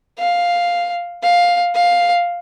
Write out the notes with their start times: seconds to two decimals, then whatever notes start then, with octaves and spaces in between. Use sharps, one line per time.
0.19 F5
1.23 F5
1.75 F5